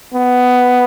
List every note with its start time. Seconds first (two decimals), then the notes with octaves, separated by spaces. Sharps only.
0.14 B3